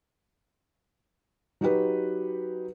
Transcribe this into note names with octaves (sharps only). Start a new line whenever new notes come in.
F#3 D#4 F#4 G4 B4